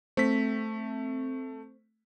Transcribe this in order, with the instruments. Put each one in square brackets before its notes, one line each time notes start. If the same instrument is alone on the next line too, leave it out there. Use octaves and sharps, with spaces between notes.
[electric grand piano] A3 B6 [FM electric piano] C4